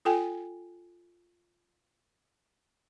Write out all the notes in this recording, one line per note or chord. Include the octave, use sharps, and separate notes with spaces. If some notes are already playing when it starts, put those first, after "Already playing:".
F4 A4 G5 G#5